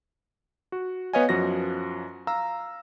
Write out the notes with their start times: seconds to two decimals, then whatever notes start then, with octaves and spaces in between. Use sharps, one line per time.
0.72 F#4
1.13 B3 B4 C#5 D#5 F5 G#5
1.29 F#2 F3 F#4 A#6
2.27 F5 A#5 E6